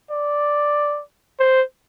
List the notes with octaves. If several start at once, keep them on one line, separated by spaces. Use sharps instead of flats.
D5
C5